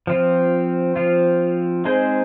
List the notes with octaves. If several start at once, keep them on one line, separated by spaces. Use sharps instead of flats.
F3 C4 F4
F3 C4 F4
G#3 C4 D#4 G#4 C5